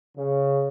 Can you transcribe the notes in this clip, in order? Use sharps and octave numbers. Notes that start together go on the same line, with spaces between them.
C#3